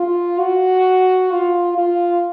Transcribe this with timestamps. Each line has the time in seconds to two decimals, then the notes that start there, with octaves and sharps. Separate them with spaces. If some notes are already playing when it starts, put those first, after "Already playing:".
Already playing: F4
0.39 F#4
1.32 F4
1.78 F4